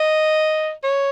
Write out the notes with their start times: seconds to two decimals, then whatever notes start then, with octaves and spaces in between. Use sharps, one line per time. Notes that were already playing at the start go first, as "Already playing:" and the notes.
Already playing: D#5
0.84 C#5